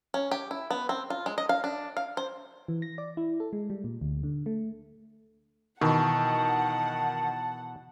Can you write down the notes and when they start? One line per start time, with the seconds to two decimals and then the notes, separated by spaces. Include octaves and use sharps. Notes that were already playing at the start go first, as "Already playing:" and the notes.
0.14 C#4
0.31 G4
0.51 E4
0.71 B3
0.89 C4
1.10 F4
1.26 G#3
1.38 D#5
1.49 F5
1.64 D4
1.97 F5
2.17 C5
2.68 E3
2.82 A#6
2.98 D5
3.17 E4
3.40 A4
3.53 G#3
3.70 G3
3.84 A#2
4.01 D2
4.23 D3
4.46 A3
5.81 B2 D#3 E3 F#5 A5